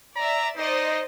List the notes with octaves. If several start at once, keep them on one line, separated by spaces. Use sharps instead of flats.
D5 E5 A#5
D#4 C5 D5 D#5